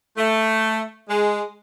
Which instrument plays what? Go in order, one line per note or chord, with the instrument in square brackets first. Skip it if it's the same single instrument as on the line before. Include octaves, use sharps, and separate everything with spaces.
[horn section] A3
G#3